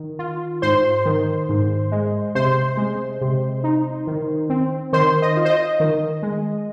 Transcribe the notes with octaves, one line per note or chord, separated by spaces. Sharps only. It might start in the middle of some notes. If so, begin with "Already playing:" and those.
Already playing: D#3
F4
G#2 C5 C6
D#3
G#2
G#3
C3 C5 C6
G#3
C3
D#4
D#3
C4
D#3 C5 C6
D#5
F4
C5
D#5
D#3
G#3